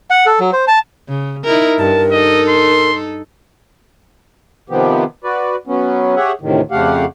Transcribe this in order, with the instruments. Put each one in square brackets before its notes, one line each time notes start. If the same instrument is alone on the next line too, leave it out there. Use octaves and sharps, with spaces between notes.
[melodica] F#5
A4
F#3
C5
A5
[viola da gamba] C#3
D#4 E4 A#4
[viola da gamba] G2 [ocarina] A#4 [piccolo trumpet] A5
[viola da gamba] D#4 A4 [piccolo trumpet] D#5
[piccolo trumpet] C6
[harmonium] C3 D#3 F3 B3 G4
F#4 B4 D5
F#3 B3 C#4
G4 G#4 C#5 E5 F#5
D2 A2 C3 D#3
F2 C#3 A3 G4 F5 F#5